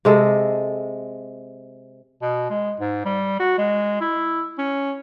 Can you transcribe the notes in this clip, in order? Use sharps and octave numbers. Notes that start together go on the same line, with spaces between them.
C3 G#3 A4
B2
G#3
G#2
G3
F#4
G#3
E4
C#4